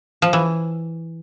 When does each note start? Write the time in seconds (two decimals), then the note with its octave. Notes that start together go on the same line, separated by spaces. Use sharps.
0.22 F3
0.33 E3